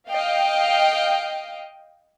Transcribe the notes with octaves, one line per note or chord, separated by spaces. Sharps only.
D#5 F5 G5